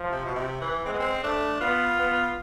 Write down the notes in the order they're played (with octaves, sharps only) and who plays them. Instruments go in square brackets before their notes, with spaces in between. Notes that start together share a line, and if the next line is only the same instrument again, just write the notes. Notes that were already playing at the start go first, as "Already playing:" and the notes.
Already playing: [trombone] F3
[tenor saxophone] C3
B2
C3
E3
[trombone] G#3 [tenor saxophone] C4
[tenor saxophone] B3
C4
[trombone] A3 [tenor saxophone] D4
[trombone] B3 [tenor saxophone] F4
[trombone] B3